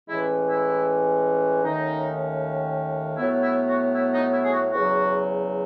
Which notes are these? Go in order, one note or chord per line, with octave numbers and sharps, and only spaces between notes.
A2 E3 G#3 C#4 E4
E4
D#2 D#3 A3 C#4 D#4
A2 F#3 B3 E4
E4
F#4
E4
D#4
E4
G#4
F#4
E2 C#3 F#3 F#4